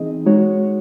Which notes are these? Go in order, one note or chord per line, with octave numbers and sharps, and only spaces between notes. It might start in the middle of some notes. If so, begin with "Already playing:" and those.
Already playing: E3 C4 D#4 G#4 D#5
G#3 D#4 F#4 C#5